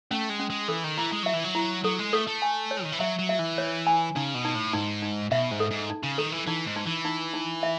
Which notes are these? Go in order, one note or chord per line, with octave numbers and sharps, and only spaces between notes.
A3 C#4
G#3
C#4
G#3
E3 A4
D#3
E3 E4
G#3
F#3 E5
E3
F#3
E4
F#3 A4
G#3
A3 A4
A3
G#5
C#5
D#3
E3
F#3 E5
F#3
E5
E3
C#5
G#5
C#3 D#4
B2
D#4
A2
G#2 D#4
D#4
B2 E5
G#2
A4
G#2
D#4
C#3
D#3 A4
E3
E3 D#4
G#2
D#4
E3
D#4
D#4
E5